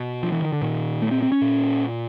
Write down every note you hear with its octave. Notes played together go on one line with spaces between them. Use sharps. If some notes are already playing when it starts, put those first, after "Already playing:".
Already playing: B2
F3
E3
D#3
D3
A#2 D#3
A3
C4
C4
C#4
A#2